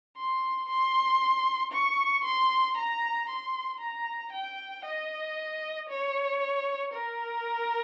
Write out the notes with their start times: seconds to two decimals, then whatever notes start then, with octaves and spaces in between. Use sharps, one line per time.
0.17 C6
0.69 C6
1.72 C#6
2.24 C6
2.77 A#5
3.30 C6
3.80 A#5
4.33 G5
4.85 D#5
5.89 C#5
6.94 A#4